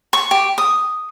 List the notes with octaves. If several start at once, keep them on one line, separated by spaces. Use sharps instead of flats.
C#6
G4
D#6